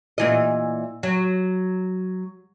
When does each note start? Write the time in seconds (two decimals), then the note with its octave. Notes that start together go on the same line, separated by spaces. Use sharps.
0.18 A#2 E3 D#5
1.03 F#3